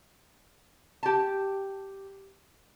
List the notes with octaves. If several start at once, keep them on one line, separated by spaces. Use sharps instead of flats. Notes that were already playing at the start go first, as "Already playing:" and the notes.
G4 A5